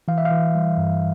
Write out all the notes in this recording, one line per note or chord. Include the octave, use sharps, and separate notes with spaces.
E3 F5
E5
F5
E3
G3
G2